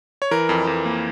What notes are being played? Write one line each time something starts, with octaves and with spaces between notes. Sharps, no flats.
C#5
E3 A#4
F2
F2
A#3